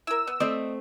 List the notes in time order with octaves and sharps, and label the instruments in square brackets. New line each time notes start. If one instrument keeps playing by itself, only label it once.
[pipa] E4 A#4 [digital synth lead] E6
[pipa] B3
[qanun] A3 C4 [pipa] C5 D5 D#5